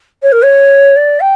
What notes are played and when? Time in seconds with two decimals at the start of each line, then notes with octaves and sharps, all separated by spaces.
0.23 C#5
0.32 A#4
0.44 C#5
0.96 D5
1.20 G5